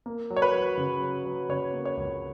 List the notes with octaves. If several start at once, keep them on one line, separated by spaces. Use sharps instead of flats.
A#3
F#3
C#5
B4
F#3
C#3
F#3
F#3
C#3 C#5
A#3
C#5
C#2